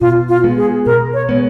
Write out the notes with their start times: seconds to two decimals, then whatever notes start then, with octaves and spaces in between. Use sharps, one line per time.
0.01 B2 F4
0.29 F4
0.44 G#3 B3
0.57 G#4
0.86 B2 A#4
1.14 C#5
1.29 G#3 B3